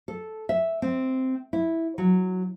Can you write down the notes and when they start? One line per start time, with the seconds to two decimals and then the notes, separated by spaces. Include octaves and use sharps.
0.08 A4
0.49 E5
0.82 C4
1.53 E4
1.98 F#3